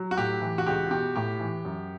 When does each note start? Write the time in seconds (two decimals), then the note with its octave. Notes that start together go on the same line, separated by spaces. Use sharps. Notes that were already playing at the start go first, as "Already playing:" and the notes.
Already playing: F#3
0.11 F#4
0.17 A2 G4
0.42 E3
0.58 F#4
0.66 C#2 G4
0.91 B2 G4
1.16 A2 G4
1.40 E3
1.65 F#2